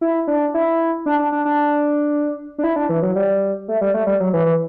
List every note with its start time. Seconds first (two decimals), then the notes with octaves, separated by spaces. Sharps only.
0.01 E4
0.27 D4
0.54 E4
1.06 D4
1.19 D4
1.32 D4
1.45 D4
2.58 D4
2.64 E4
2.76 D4
2.89 E3
3.02 F#3
3.15 G3
3.68 A3
3.81 G3
3.94 A3
4.07 G3
4.20 F#3
4.33 E3
4.46 E3